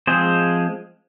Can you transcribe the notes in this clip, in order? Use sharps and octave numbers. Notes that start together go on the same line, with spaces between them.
F3 G#3 C4 G#4 C5